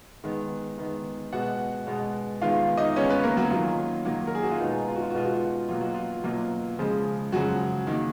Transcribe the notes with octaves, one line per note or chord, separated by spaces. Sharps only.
D#3 G#3 B3
D#3 G#3 B3
B2 G#3 B3 F#4 F#5
B2 G#3 B3
D#3 G#3 B3 F4 F5
D#4 D#5
D#3 G#3 B3 C#4 C#5
B3 B4
A#3 A#4
F#3 F#4
D#3 F#3 A#3 F4
D#3 F#3 A#3
A#4
G#4
F#4
F4
B2 G#3 B3 D#4
F4
F#4
F4
F#4
B2 G#3 B3 F4
F#4
F4
B2 F#3 A#3 F4
F#4
F4
B2 F#3 A#3 F4
C#3 F3 G#3
C#3 F3 F#3 G#3 F#4
D#3 A#3